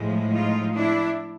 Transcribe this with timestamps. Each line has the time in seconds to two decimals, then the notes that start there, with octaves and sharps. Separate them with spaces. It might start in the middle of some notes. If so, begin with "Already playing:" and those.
Already playing: A2 F3 G#3
0.34 D#4 F4
0.76 D4 E4